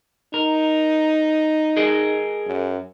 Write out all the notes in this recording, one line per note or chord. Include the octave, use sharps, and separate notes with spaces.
D#4 A#4
G#4 A#4 D#5
F#2